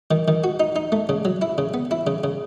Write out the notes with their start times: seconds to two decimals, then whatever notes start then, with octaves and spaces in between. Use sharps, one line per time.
0.11 D#3
0.28 D#3
0.44 F#4
0.60 D#4
0.76 D#4
0.92 A3
1.09 C#3
1.25 F#3
1.42 E4
1.58 C#3
1.74 B3
1.91 E4
2.07 C#3
2.24 C#3